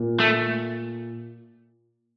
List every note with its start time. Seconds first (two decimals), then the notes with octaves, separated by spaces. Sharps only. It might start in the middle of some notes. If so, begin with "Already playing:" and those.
Already playing: A#2
0.20 A3